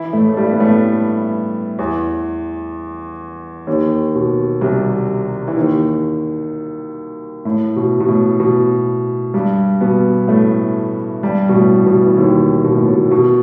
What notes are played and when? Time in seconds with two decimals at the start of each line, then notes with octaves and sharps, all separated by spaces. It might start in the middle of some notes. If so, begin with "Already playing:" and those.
Already playing: E3 E4
0.13 A2 A3
0.29 A3
0.37 G2 G3
0.52 B3
0.60 A2 A3
1.79 E2 E3
3.67 D#2 D#3
4.15 B2
4.61 C2 C3
5.48 E3
5.56 D#2 D#3
7.45 A2
7.76 B2
8.00 B2
8.08 A2
8.40 B2
9.34 G2 G3
9.81 B2 B3
10.28 A2 A3
11.23 G2 G3
11.49 B2
11.55 A2
11.86 B2
12.06 E3
12.17 D#2 D#3
12.64 B2
12.76 A2
12.88 B2
13.11 B2